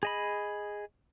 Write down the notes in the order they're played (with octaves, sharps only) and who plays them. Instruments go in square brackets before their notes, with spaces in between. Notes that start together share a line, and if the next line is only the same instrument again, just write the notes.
[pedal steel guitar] G#4 D#5 B5